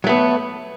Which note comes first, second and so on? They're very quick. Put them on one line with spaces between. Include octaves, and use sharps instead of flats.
F#3 A3 B3